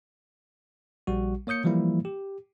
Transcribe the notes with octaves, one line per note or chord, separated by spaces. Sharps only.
A#1 G3 F#4
A#3 C#5 D#6 G6 C#7
E3 F3 G3 A#3 E4
G4